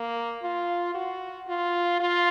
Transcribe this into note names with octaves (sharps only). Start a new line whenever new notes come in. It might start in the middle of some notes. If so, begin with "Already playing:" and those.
Already playing: A#3
F4
F#4
F4
F4